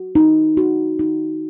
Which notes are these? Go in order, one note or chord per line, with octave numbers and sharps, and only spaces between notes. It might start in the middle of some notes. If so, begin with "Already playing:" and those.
Already playing: F#4
D#4
F#4
D#4